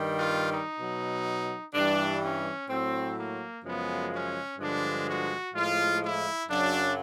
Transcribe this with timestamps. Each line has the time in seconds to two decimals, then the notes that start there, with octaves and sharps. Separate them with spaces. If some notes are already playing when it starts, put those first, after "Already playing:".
Already playing: G2 D#3 G3
0.16 F4
0.48 D#4
0.80 B2 F#3
1.74 G2 E3 G3 D4
2.21 C#4
2.69 A2 F#3 C4
3.16 A#3
3.64 F#2 C#3 F3 G#3 B3
4.11 C#4
4.58 G2 D3 F3 G#3 D4
5.06 F#4
5.53 A2 F3 G#3 F4
6.00 E4
6.48 F#2 C#3 F#3 D4